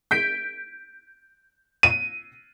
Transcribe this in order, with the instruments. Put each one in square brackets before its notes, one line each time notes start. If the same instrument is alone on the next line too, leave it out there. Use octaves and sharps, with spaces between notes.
[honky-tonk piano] G6 B6 D7
[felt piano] D#7